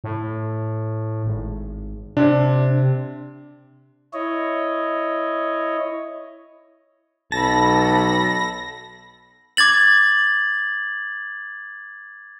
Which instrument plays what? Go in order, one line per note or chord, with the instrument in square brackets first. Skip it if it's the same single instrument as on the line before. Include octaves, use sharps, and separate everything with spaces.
[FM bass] A2
G#1
[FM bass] C3 [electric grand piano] D4
[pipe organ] E4 C#5 D#5
[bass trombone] B1 [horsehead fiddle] A4 B5 [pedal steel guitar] A5 [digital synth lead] A#6
[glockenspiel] D6 G#6 A6 F#7